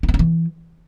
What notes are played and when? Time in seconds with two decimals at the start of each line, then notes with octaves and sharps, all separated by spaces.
0.03 D4
0.09 B3
0.14 C#4
0.19 E3